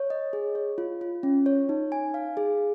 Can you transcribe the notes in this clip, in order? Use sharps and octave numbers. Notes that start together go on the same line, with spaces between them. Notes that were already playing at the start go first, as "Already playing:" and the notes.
Already playing: C#5
D#5
G#4
C#5
F4
F4
C#4
C#5
D#4
G#5
F5
G#4